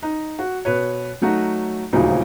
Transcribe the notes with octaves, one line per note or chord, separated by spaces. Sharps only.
D#4
F#4
B2 B4 C#5
F#3 A3 D#4 F#4
D#1 D2 C#3 F3 F#3 D#4